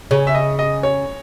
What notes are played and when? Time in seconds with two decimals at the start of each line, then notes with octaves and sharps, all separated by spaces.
0.11 C#3 C#5
0.27 E5
0.35 D#5
0.59 D#5
0.83 C#5